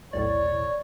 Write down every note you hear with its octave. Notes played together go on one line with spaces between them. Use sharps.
B1 E2 A2 C#5 D5